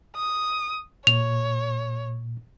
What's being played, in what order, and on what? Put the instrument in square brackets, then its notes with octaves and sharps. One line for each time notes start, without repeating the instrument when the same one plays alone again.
[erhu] D#6
[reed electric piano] A#2 [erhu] C#5 [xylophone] F7